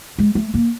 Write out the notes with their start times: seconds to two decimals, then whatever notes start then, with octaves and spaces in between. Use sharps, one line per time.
0.18 G#3
0.35 A3
0.54 A#3